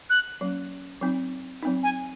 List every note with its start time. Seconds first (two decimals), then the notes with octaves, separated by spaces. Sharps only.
0.10 F#6
0.41 F#3 A#3 C#4
1.01 F#3 C4 D#4
1.63 F#3 C4 D#4
1.83 G#5